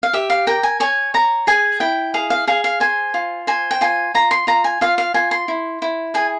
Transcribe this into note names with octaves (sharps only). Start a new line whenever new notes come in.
F5
G4 E5
F5
A#4 G5
G#5
C#5 G#5
C#5 A#5
G#4 G#5
E4 G5
G#4 F5
F5
G#4 F5
F5
C5 G#5
F4
C5 G#5
G5
F4 G#5
F4 A#5
C6
F4 A#5
G#5
F4 F5
F5
F4 G#5
C6
E4
E4
G#4 G#5